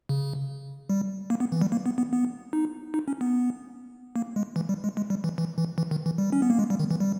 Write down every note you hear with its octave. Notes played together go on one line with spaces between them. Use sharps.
C#3
G3
A#3
B3
E3
G3
A#3
B3
B3
B3
D#4
D#4
C#4
B3
A#3
G#3
E3
G3
G#3
G#3
G3
E3
E3
E3
E3
D#3
E3
G3
C#4
B3
A#3
G#3
G3
D#3
E3
G3